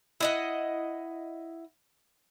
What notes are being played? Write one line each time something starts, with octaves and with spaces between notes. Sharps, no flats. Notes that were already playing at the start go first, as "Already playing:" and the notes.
E4 D#5 F#5